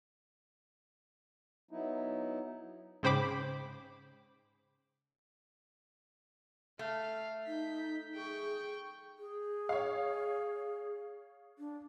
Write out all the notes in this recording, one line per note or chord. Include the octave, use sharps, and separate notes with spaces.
F#3 B3 D#4 E4
G#2 C#3 C5 G5 B5 D6
A3 F5
D#4 G6 B6
G#4 G5 C#6
G#4
C#5 F5
D4